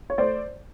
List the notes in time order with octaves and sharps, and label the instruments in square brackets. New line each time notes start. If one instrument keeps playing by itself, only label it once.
[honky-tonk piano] C#5
A3 C5 D5